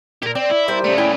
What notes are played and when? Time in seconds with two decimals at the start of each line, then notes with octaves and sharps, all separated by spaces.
0.23 A#2 G4 A#4
0.35 C4 D5
0.50 E4
0.68 G3 A#3 C4 C6
0.84 C#3 A3 D5
0.98 E4 G5 G#5